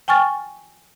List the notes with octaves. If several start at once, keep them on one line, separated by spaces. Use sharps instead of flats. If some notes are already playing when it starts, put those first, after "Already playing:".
G5 G#5 C#6 F6 A6